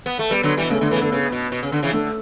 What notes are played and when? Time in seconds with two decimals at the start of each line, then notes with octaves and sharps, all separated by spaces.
0.06 B3
0.19 A3
0.30 G3 B3
0.43 D3 F#3
0.57 E3 G3
0.65 B2
0.70 C#3 A3
0.81 D3 A3
0.91 C#3 E3 B3
1.01 D3 B3
1.12 C#3 B3
1.32 B2
1.52 B2
1.63 C#3
1.72 D3
1.82 C#3 E3
1.93 D3 A3